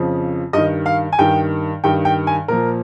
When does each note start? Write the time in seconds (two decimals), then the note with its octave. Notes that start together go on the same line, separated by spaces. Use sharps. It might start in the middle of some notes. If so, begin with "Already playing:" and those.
Already playing: F2 C#3 F3
0.53 G2 D#3 D#5
0.86 F5
1.13 G#5
1.19 G2 D#3 G5
1.84 G2 D#3 G5
2.05 G5
2.27 G#5
2.48 A#2 F3 A#4